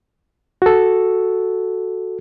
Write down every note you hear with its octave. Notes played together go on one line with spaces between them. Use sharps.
F#4 A4